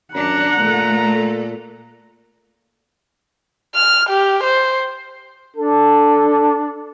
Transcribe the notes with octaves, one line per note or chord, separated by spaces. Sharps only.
F#2 D4 F#5 A#5
A#2 A3 A4
F6
G4
C5
D4 A4